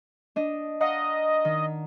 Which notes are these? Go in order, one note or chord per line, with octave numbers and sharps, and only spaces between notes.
D4 D#5
D#5 F5 F#5 A#5
D#3